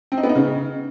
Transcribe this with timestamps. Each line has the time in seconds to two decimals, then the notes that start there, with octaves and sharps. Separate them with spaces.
0.12 C4
0.18 D#4
0.24 B3
0.29 D#4
0.35 C#3